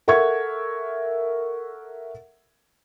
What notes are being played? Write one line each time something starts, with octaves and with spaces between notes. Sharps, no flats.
A4 A#4 E5 F#5 C#6 G#6